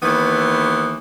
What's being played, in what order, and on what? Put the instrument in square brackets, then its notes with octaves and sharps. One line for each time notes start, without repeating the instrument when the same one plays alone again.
[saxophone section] D#2 E3 B3